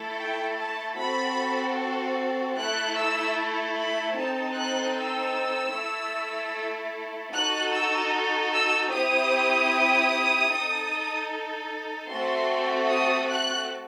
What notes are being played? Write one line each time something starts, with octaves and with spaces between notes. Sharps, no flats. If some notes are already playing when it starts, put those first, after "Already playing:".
Already playing: A3 E4 A4
G5
A5
C4 F#4 A4 B5
A3 E4 A4 F#6
E6
B5
C4 D#4 A4 A5
F#6
E6
A3 E4 A4
D#4 F#4 A4 F#6
E6
E6
C4 E4 G4 D#6
D#4 A4
A3 C4 F#4 A4 C6
D#6
F#6